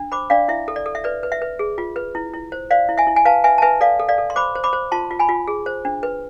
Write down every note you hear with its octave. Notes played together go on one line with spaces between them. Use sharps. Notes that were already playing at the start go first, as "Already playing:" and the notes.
Already playing: D4
C5 B5 D6
D4 D5 F5
E4 E5
A4
D5
A4
E5
B4 D5
B4
E5
B4
G#4
F4
B4
E4
E4
C5
C5 D5 F5
E4
E5 G#5
E4
G#5
B4 F5 A5
B4 E5 G#5
A5
B4 E5 G#5
A4 D5 F5
A4
D5 F5
A4
C6
C5 B5 D6
C5
B5 D6
C5
F4 A5 C6
F4
G#5 B5
F4
G#4
C5
D4
B4